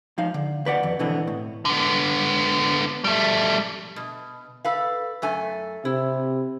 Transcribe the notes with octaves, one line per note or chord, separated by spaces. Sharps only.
F3 D#4 F5
D3
D#2 B4 D5 F#5
F2
B2 D3 E3 B3 C4
A2
D3 B3
G3 A3
B2
A4 B4 F5
F#2 A3 G#5
C3 E4